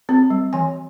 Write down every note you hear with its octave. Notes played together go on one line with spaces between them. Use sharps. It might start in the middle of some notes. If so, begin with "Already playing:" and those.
C4
G3
E3 G#5